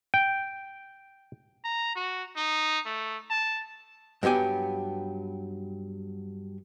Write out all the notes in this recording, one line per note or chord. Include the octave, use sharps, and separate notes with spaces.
G5
A#5
F#4
D#4
A3
A5
G2 F#3 B3 G4 G#5